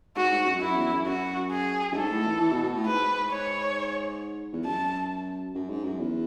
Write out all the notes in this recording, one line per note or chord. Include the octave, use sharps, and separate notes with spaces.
G#2 F#4
G#2
F#2
F#2 E4
E2
F#2
F#2 F#4
G#4
F#2
G#2 A4
A2
E3
E3
B2
B2
A2
G#2 B4
C#5
E2
F#2 A5
F#2
G#2
F#2
E2